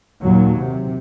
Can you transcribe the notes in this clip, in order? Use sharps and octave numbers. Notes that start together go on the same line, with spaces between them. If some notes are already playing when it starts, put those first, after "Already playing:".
D#2 A#2 F#3
C3